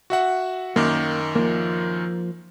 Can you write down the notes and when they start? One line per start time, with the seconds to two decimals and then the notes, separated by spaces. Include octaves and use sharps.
0.10 F#4 E5 F#5
0.76 F#2 D#3 A#3 D6
1.36 F3 A#3